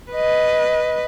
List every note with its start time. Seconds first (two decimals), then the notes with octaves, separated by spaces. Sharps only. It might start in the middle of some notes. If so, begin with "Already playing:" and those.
0.11 B4 D#5